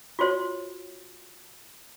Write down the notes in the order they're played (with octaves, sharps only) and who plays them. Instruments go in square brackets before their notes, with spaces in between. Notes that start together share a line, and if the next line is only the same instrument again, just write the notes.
[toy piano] F4 F#4 C5 C#5